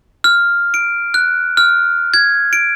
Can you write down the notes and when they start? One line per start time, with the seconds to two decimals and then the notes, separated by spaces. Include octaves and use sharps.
0.24 F6
0.74 D7
1.14 F#6
1.57 F6
2.14 G#6
2.53 D7